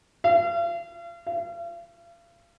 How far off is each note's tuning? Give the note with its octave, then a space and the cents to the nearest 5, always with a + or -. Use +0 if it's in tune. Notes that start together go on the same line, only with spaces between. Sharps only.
F5 -40
F5 -40